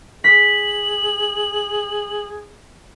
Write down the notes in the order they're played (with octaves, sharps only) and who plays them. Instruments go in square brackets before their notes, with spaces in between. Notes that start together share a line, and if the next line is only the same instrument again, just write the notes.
[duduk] G#4 [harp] B6 [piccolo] F#7